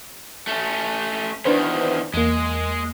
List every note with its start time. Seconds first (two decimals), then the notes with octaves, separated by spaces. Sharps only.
0.47 A3 C#4
1.45 E2 D#3 D4 B4 C5
2.14 E2 G#3 A#3